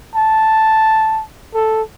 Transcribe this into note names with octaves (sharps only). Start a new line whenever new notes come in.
A5
A4